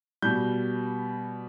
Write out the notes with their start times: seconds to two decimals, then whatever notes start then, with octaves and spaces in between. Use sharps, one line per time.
0.22 B2 G3 G6